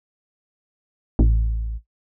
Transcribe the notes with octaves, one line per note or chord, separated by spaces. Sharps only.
A1